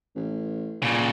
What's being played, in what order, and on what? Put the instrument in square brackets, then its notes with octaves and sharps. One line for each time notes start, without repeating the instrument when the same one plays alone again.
[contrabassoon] A1
[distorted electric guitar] A#2 C#3